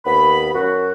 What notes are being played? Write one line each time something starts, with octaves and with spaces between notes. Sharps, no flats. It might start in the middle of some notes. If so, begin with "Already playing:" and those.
D#2 B3 B5
F#2 F#4